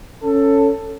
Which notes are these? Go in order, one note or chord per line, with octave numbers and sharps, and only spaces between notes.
C#4 A4